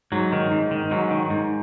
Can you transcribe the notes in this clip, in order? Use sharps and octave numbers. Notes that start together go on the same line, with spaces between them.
G#2 F#3
D#3
G#2
D#3
G#2 F#3
D#3
G#2